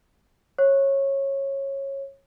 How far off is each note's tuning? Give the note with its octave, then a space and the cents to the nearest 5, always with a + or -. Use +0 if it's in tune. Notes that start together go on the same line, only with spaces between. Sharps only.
C#5 -20